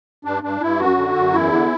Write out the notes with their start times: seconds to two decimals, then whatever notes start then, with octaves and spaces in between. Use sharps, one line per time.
0.25 G2 D4
0.43 G2 D4
0.61 G2 E4
0.79 F#2 F#4
0.97 D3
1.15 F#2
1.33 E2 E4
1.52 D3